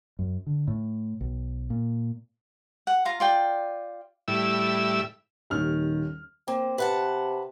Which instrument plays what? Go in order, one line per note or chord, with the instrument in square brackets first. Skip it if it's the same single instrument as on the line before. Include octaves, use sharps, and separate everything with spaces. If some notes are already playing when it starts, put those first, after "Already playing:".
[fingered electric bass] F#2
D3
A2
B1
A#2
[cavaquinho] F#5
F4 F5 A#5
F4 D5 G5
[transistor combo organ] A2 G3 E4 E6
[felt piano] D#1 D#2 C#4 [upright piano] D#3 F6
[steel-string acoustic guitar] A#3 [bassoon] C4
[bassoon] C3 [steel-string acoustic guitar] B4 F#5 A5